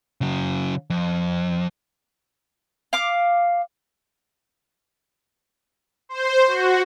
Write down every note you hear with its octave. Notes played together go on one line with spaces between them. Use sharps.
C#3 F#3
F2
F5 D6
C5
F#4